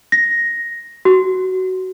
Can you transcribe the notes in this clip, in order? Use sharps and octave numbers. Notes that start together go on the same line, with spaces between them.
A#6
F#4